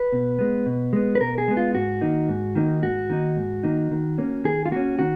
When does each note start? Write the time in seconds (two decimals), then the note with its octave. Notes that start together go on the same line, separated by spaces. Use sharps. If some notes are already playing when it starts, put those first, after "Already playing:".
Already playing: B4
0.12 B2
0.39 G#3 B3
0.66 B2
0.93 G#3 B3
1.15 B4
1.20 B2 A#4
1.38 G#4
1.48 G#3 B3
1.57 F4
1.75 G#2 F#4
2.01 D#3 A#3 D#4
2.29 G#2
2.55 D#3 A#3 D#4
2.83 G#2 F#4
3.10 D#3 A#3 D#4
3.37 G#2
3.63 D#3 A#3 D#4
3.91 D#3
4.18 A#3 C#4
4.44 D#3 G#4
4.66 F4
4.71 A#3 C#4 F#4
4.99 D#3 F#4